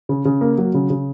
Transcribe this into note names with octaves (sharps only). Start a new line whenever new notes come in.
C#3
C#3
A#3
F#3
C#3
C#3